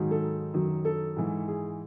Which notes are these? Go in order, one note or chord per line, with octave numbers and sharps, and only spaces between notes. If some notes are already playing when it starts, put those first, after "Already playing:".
Already playing: G#2 D#3 F#3
A4
F#2 D#3 F#3
A4
G#2 E3
G#4